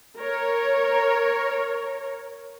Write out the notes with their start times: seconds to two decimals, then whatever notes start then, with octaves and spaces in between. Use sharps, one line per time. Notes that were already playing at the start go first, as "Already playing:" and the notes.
0.17 A#4 C#5